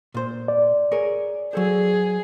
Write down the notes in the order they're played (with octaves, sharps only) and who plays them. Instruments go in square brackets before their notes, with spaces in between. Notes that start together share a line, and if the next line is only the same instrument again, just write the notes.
[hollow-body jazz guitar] A#2 C5
[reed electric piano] D5
[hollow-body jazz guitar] G#4 A#4 C#5
[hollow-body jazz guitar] F#3 A4 C5 [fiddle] G#4